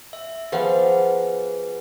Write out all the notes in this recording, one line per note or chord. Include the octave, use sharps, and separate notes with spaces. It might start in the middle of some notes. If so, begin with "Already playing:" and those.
E5
F3 B3 G#4 B4 F5 F#5